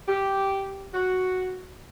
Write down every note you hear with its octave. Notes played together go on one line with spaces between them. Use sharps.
G4
F#4